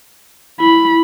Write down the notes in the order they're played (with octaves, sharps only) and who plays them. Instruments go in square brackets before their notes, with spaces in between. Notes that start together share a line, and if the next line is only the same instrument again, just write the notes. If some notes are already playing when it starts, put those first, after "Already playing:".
[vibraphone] E4 [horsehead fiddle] B5